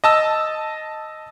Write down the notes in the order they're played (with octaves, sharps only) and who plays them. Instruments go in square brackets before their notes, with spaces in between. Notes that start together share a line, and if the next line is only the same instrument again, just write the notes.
[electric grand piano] D#5 A5 E6